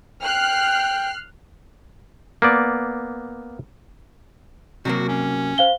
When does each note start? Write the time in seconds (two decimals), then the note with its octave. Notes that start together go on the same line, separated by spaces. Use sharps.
0.23 G5 F6 F#6 C7
2.42 A#3 B3 D5
4.85 C3 F#3 A#3 F#4
5.09 C#4
5.58 C5 F5 G7